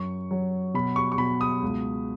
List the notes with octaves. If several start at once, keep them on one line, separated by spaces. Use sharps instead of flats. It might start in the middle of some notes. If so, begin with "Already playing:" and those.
Already playing: F#2 C#6
F#3
B2 B5
C#6
C#6
B2 B5
D#6
C#2